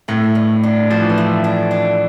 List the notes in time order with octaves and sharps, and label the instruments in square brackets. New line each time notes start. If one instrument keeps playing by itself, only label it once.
[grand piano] A2 [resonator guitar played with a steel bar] A3
[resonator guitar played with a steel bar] G2
D4
[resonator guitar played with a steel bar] G2 [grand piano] F3
[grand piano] E3
F3
[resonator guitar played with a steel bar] A3
D4
D4